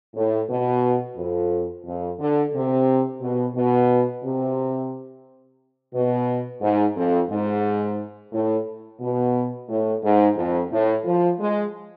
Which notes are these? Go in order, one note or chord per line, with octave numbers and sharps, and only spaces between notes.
A2
B2
F2
F2
D3
C3
B2
B2
C3
B2
G#2
F2
G#2
A2
B2
A2
G#2
F2
A2
F3
G#3